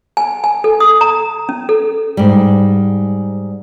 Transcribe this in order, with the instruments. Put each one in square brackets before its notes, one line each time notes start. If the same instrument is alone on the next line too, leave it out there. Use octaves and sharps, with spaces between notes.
[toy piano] G#5
G#5
A4
D#6
A#5
C#4
A4
[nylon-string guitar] G#2 G3